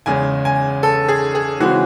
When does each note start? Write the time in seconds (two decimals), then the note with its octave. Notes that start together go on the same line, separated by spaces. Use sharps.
0.06 E2 C#3 G#3 G#5
0.45 G#5
0.83 A4
1.09 G#4
1.35 G#4
1.60 C#3 E3 G#3 C4 F#4